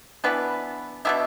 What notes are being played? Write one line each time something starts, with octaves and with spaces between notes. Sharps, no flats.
E3 B3 D4 B4
B2 B3 D4 E5